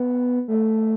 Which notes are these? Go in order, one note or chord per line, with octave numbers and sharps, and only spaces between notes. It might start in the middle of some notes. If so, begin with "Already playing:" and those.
Already playing: B3
A3